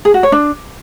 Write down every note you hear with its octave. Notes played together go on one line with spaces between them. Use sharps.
G#4
F#4
C#5
D4